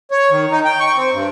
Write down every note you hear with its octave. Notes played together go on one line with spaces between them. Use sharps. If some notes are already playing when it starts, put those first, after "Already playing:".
C#5
D#3
D#4
G5
C#6
C4
G2